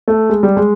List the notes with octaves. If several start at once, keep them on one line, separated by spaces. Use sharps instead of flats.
A3
G#3
G3
G#3